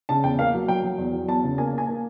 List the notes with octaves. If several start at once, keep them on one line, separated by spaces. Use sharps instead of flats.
C#3 A5
E2 G5
A#3 F5
F#3
F#3 G5
F#3
E2
F#3
E2 A5
C#3
A#3 G#5
A#3 G#5
A#3